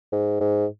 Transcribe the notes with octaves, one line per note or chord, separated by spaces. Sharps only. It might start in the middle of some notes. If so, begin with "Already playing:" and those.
G#2
G#2